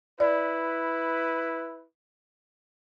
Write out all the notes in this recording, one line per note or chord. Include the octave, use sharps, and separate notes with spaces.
E4 B4 D5